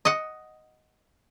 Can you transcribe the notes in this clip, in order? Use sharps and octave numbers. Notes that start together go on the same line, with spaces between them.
D#5 F#5